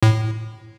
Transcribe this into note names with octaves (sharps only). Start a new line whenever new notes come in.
A2